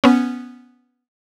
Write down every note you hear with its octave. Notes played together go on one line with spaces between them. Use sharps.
B3 C#4